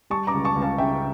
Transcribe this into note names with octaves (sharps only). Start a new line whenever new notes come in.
G3 A5 C#6
A#5 D6
C#2
A5 C#6
C#2
F5 A5
C#3 E5 G5